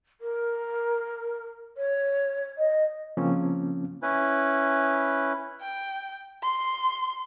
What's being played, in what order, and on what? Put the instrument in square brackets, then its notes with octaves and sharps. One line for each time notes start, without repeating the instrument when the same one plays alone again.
[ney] A#4
C#5
D#5
[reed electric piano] C#3 F3 A#3 C4 C#4
[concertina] C#4 E4 B4
[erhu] G5
C6